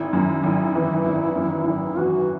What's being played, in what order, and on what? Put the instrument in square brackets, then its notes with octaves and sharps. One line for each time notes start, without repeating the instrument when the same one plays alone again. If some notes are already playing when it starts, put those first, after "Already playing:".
Already playing: [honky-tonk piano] G#1 [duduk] E4
[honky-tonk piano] F#2
G#1
E3
G#1
F#2
[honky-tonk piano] G#1 [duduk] E4
[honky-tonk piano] E3 [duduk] F#4